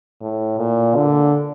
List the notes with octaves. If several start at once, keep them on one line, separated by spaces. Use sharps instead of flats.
A2
A#2
D3